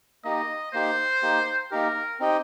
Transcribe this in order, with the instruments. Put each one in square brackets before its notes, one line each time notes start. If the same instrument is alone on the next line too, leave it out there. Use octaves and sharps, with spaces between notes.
[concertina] A#3 D#4 G4 [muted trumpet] D#5
[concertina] A#3 D#4 G4 [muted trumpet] C5
[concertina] A#3 D#4 G4
[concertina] A#3 D#4 G4 [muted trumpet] A#4
[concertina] C4 D#4 G4 D#5 G5